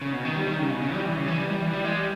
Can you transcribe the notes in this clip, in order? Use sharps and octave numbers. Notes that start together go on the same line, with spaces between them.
C#3
B2
D#3
G3
D#3
C#3
B2
C#3
G3
E3
C#3
E3
G3
G3
E3
G3
G#3
G3